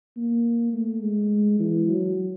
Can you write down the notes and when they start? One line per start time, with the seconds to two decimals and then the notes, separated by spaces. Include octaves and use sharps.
0.17 A#3
0.73 A3
1.03 G#3
1.59 E3
1.88 F#3